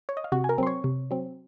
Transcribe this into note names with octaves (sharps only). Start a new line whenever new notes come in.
C#5
D#5
F5
C3 F#4 F#5
G#5
A#4 A#5
F#3 C4 C6
C#5 C#6
C3
F#3 C4